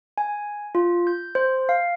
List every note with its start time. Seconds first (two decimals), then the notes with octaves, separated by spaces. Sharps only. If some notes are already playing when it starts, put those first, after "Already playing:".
0.18 G#5
0.75 F4
1.07 G6
1.35 C5
1.69 F5